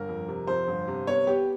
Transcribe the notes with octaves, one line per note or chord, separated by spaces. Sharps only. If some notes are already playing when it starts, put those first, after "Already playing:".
Already playing: G1 A#4
F2
C3
F2 C5
G1
C3
B3 C#5
B3 G4